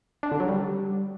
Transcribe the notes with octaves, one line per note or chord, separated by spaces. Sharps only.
D4
D3
F#3
G3